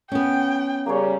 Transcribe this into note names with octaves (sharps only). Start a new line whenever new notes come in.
B3 C#4 G5
C#3 G3 A#3 G#4 C#5